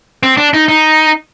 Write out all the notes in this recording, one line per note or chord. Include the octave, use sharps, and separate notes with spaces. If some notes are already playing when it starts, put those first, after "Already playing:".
C4
D4
D#4
D#4